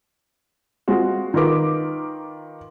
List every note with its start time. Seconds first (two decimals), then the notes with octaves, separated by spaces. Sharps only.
0.88 G#3 C4 F4 F#4
1.34 D#3 F4 A#4 B4 D6